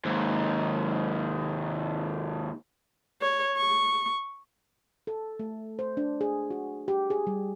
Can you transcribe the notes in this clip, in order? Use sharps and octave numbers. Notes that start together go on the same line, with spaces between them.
D#2 G#2
C#5
C#6
A4
A3
C5
D4
G#4
F#4
G4
G#4
G3